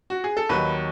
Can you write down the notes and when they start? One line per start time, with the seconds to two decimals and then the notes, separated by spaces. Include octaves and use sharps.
0.10 F#4
0.24 G#4
0.37 A4
0.49 D#2 D#3 F#3 B4